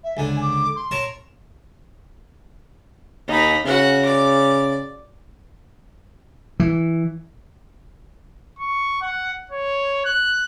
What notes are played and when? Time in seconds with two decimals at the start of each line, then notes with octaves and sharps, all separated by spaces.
0.03 E5
0.17 C#2 D3 G#5
0.41 D6
0.76 C6
0.91 A#4 C#5 A5
3.28 D#2 D#4 B5
3.66 C#3 F#4 F#5
4.05 D5 D6
6.60 E3
8.59 C#6
9.02 F#5
9.51 C#5
10.05 F#6